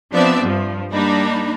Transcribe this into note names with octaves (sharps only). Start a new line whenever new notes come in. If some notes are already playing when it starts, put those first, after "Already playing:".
F3 B3 C4 D4 D5 E5
G2 F3
G3 A#3 D4 D#4 B5